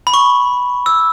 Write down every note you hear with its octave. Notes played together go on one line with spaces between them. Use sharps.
B5
C#6
E6